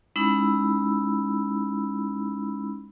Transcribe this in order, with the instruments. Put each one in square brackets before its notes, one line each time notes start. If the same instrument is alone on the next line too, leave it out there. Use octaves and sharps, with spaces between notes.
[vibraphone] G#3 C#4 D#4 E4 B5 E6